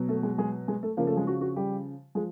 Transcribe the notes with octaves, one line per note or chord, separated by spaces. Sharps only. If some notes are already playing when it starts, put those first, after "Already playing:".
Already playing: B2 F#3
A3 A4
G#3 G#4
G#3 G#4
G#3 G#4
A3 A4
C#3 F3 A#3 A#4
A3 A4
G#3 G#4
F#4
F#4
G3 G4
F3 G#3 G#4